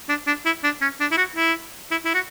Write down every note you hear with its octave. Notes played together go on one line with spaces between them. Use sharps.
D4
D4
E4
D4
C#4
D4
E4
F#4
E4
E4
E4
F#4